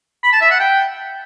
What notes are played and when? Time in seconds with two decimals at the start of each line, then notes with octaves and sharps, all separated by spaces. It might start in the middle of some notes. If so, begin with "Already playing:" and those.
0.23 B5
0.32 A5
0.41 E5
0.50 F#5
0.59 G5